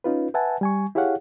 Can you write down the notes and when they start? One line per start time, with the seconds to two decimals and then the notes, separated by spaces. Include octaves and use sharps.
0.04 C#4 D#4 F4 B4
0.34 B4 E5 F#5 G#5 A5
0.61 G3 G#5 C#6
0.95 E4 G4 G#4 C#5 F5 F#5